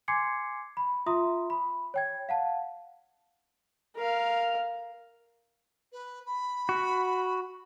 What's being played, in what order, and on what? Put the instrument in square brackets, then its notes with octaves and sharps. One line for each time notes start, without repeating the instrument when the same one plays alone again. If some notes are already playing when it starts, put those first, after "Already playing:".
[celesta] G#5 C6 D6 G#6 C7 C#7
B5
F4 E5 A#5 C6 D#6
B5
C#5 G5 G#6
F5 F#5 A5
[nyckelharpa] A#4 F5
[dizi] B4
B5
[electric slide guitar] F#4